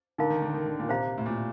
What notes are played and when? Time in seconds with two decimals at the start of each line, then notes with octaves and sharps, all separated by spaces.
0.18 D3 D#4 A#4 F5 A#5
0.30 D#3
0.42 D3
0.54 D#3
0.66 D3
0.79 A#2
0.89 C3 C5 F5 A#5
1.18 A2
1.26 A#2